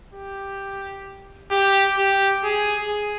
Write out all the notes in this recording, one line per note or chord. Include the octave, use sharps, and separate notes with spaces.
G4
G4
G4
G#4
G#4